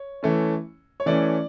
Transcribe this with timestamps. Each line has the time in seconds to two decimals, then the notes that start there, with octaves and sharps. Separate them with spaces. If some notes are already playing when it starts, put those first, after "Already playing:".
Already playing: C#5
0.23 E3 A3 C#4
1.00 C#5
1.06 E3 A3 C#4 D5